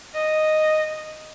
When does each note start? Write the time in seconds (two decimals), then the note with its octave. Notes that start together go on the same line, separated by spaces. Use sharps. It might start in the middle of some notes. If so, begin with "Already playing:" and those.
0.15 D#5